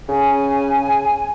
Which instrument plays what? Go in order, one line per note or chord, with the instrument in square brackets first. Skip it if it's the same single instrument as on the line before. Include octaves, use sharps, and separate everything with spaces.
[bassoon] C#3 [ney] G#5